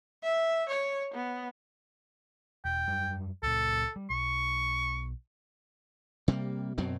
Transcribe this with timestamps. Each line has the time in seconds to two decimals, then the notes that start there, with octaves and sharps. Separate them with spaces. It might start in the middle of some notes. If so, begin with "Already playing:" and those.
0.23 E5
0.69 C#5
1.14 B3
2.65 E1 G5
2.88 F#2 G3
3.43 C#2 A#2 A4
3.96 G3
4.10 B1 C#6
6.28 C3 G3 G#3 A#3
6.78 F#2 B2 F#3 C4